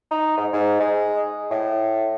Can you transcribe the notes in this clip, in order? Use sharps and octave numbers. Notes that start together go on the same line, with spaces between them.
D#4
G#2
G#2
G#3
A2